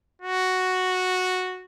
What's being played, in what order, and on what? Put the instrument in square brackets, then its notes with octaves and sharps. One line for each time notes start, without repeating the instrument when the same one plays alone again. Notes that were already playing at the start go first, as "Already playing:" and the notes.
[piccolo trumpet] F#4